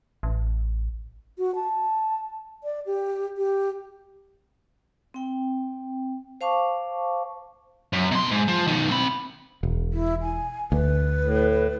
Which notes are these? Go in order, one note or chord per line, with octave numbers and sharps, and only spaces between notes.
A1
F#4
A5
D5
G4
G4
C4 G5
C5 F5 A5 C#6 D6
F#2
B2 C6
G#2
F3
B2 D#3
C4 B5
E1
E4
G#5
D2 B4
A2